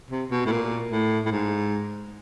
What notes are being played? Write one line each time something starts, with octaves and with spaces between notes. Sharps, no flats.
C3
B2
A2
A#2
A2
A2
G#2